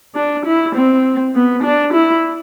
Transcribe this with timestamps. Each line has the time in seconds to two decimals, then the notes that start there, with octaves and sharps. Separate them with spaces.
0.15 D4
0.45 E4
0.75 C4
1.35 B3
1.63 D4
1.93 E4